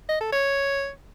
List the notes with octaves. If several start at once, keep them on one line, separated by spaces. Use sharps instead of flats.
D#5
A4
C#5